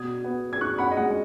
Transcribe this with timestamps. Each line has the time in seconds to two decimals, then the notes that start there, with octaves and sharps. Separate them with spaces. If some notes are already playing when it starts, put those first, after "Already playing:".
Already playing: B2 D#6 G#6
0.24 B3
0.53 G#6
0.61 D#4 C#6 F#6
0.78 F#5 B5
0.91 D#5
0.97 G#3 F#5